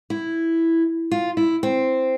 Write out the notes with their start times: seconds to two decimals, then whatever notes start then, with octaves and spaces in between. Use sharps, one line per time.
0.10 E4
1.11 F4
1.37 E4
1.63 C4